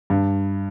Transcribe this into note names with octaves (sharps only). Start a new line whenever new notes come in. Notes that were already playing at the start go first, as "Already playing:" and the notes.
G2